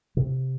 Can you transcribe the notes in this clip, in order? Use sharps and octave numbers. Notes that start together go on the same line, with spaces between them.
C3